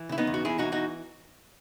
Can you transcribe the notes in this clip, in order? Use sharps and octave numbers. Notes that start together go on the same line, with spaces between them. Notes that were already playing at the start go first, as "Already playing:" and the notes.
Already playing: E3
C#3 E4
B3 D#4
E2
F#4
E2 E4 G#4
E3 D#4 F#4
D#4 F#4